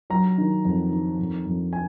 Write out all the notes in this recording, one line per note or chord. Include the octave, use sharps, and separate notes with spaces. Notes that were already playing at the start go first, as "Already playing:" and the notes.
F#3 A#5
D#3
F2
D#3
F2
F2
G#5